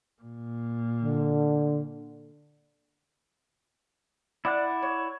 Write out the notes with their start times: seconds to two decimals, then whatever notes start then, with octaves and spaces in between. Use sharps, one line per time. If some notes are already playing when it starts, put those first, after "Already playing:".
0.22 A#2
1.02 D3
4.45 E4 D5 F#5 F#6
4.82 C#5